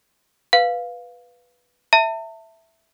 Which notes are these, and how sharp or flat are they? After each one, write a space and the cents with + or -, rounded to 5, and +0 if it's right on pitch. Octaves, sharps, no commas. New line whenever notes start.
B4 +0 F5 +5
E5 +0 A5 +40